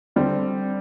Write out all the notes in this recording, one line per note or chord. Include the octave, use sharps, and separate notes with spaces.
D3 G3 C4